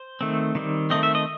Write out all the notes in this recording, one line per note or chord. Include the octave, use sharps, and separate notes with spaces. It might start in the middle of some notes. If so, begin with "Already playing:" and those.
Already playing: C5
D#3 A3 C4
D#3 G3 C4
D#3 A3 C4 D#5
E5
D#5